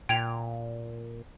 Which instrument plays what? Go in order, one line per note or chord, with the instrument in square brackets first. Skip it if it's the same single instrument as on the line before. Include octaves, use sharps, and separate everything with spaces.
[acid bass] A#2 [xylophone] G5 G#6 F7